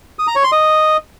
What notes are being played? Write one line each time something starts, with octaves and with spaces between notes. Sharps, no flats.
D#6
A#5
C#5
C6
D#5